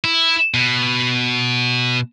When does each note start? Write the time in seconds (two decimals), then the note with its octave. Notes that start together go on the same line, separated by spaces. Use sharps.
0.04 E4
0.54 B2